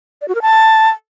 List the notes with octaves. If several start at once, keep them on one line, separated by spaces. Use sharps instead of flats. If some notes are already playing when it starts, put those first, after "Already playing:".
D5
F#4
A#4
A5